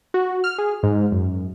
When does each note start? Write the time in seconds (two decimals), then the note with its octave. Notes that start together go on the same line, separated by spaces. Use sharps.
0.14 F#4
0.44 F6
0.58 G#4
0.83 G#2
1.12 F#2